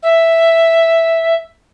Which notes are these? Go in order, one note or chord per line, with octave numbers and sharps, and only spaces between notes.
E5